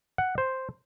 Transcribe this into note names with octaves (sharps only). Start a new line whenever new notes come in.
F#5
C5